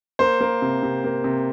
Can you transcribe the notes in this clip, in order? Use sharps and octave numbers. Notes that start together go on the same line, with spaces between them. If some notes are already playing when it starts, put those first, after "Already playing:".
A#3 C5
A#3
C3
C3
A#3
C3